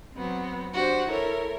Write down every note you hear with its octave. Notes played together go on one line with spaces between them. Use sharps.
F#3 B3 C4
D4 F#4 G4 C5
E4 A4 A#4 C#5